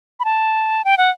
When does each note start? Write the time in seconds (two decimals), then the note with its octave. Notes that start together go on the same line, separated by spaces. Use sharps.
0.20 B5
0.25 A5
0.85 G5
0.98 F#5